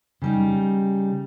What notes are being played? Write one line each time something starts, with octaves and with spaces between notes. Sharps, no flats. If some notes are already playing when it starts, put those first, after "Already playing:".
C#3 G3 D#4